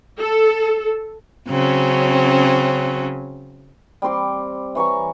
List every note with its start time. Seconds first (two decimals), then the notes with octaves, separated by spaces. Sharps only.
0.21 A4
1.48 C#3 F#3 C4 C#4
4.02 G3 C4 C6 D6
4.75 E3 C#5 A#5 C#6